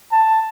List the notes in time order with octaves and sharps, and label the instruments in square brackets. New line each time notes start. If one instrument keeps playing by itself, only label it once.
[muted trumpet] A5